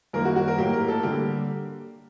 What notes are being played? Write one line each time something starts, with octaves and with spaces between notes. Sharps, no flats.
F#2 D#3 G3 A#3 A#4
F#4
F#4
A#4
A2 F#3 A#3 G4
A#4
A4
D3 G3 A#3 G4